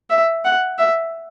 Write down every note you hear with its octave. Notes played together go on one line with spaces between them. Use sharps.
E5
F#5
E5